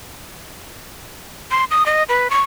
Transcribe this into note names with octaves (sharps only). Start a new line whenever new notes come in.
C6
D#6
D#5
B4
C#6